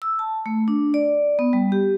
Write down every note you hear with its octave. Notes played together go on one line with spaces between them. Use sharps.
E6
A5
A3
D4
D5
B3
G3
G4